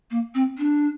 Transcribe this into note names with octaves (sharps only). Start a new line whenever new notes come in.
A#3
C4
D4